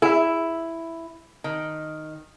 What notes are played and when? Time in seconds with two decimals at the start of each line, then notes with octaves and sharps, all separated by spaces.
0.02 E4 G#4 E5
1.44 D#3